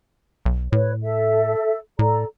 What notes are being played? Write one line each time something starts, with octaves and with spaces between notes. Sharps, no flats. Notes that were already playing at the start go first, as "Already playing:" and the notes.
B1
A2 B4 C#5
A4 E5
A2 A4 D5 A#5